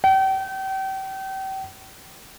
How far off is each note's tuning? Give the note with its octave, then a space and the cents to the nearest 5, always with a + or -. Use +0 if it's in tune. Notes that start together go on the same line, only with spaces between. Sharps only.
G5 -35